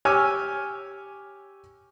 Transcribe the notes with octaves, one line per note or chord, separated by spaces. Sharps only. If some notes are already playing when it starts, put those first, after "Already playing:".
G4 C#5 G#5 D6 E6 F6